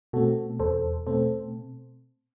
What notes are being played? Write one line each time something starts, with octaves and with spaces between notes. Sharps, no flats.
B2 A3 C4 F#4 A4
E2 A4 C5
B2 A3 C4 A4 C5